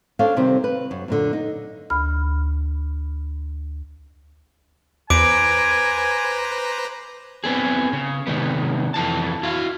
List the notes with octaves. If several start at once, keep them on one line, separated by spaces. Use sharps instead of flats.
C#4 D4 A4 C5 D5 F5
C3 D#3 G3 C4
B4
F#2
F#2 A#2 D3
D#4
D2 B5 F6
E2 B4 C5 G#5 A#5 D6 D7
B3 C4 G#4
C#3
C3 D#3 G#3 B3
F2 E3 A5
E4 F#4 F5